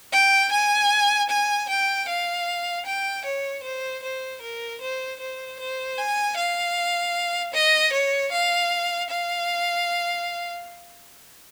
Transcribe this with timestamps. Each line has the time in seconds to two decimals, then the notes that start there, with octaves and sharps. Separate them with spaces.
0.12 G5
0.52 G#5
1.29 G#5
1.69 G5
2.08 F5
2.86 G5
3.25 C#5
3.64 C5
4.03 C5
4.42 A#4
4.81 C5
5.20 C5
5.59 C5
5.98 G#5
6.37 F5
7.54 D#5
7.93 C#5
8.32 F5
9.10 F5